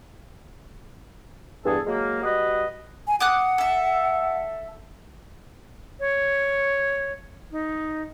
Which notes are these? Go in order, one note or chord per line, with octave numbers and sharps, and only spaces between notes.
E2 G2 G#4 A4
F#3 G#3 A#3
G3 F#4 B4 D#5
G#5
F#5 D6 D#6 F#6
A4 E5
C#5
D#4